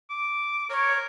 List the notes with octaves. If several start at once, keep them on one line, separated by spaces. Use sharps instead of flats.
D6
A#4 C#5